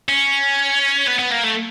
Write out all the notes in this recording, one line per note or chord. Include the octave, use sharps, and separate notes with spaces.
C#4
B3
B3
A#3
A3